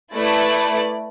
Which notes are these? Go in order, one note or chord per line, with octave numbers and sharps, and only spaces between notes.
A3 E4 B4 D5